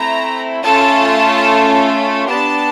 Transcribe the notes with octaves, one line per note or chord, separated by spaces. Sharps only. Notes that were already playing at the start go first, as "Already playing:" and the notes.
Already playing: A3 C4 E4 A#5
A3 C#4 F4 A4 A5
B3 D4 G4 A5